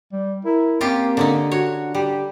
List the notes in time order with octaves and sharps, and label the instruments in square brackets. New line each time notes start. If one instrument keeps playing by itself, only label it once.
[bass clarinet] G3
[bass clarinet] E4 [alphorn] A#4
[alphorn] A#3 [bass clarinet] C4 [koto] C#4 F4 G4
[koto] D3 C#4 D#4
[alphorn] D3 [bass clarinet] F#4 [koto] C#5
[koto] G3 [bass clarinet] G4